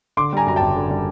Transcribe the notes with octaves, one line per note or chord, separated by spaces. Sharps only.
D3 C6 D6
G3 G#5 A#5
F#2 A#5
F#1 G5 A5
D3
G3